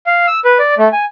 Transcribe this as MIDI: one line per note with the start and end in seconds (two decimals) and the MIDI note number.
0.07 0.26 77
0.27 0.40 88
0.45 0.58 71
0.59 0.74 74
0.78 0.88 57
0.92 1.05 80